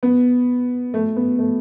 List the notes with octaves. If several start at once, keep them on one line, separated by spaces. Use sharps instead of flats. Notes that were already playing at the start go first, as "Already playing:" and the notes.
B3
A3
B3
A3